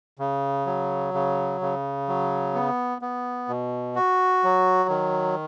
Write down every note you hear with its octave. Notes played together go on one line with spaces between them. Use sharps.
C#3
F#3
C#3
C#3
F#3
B3
B3
B2
F#4
F#3
D#3